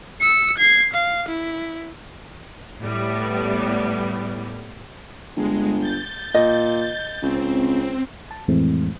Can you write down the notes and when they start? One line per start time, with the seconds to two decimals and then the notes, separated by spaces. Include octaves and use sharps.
0.21 E6 C#7
0.58 G#6 C7
0.93 F5
1.29 E4
2.81 A2 G3 B3
5.37 G1 G#3
5.79 G6 A6
6.34 A#2 D#5
7.23 C#2 C4
8.31 A5
8.48 F2 A2 E3 G#3 A3 C4